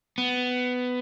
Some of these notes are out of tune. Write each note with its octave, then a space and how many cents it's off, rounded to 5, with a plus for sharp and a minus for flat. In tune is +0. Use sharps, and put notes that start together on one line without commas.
B3 +15